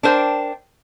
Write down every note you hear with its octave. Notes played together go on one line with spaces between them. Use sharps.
D4 A#4 C5 G5